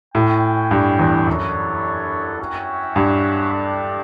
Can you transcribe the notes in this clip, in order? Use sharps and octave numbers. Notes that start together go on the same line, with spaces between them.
A2 C#4 F#4 C#5 G5
G2
E2
F#2 B3 D4 A4 C#5
C#4 F#4 C#5 E5 G5
G2
A3 D4 A4 D5 G5